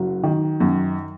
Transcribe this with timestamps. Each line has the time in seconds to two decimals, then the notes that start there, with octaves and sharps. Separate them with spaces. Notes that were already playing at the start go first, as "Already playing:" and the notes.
Already playing: F#1 F#3
0.23 D#3
0.60 F#2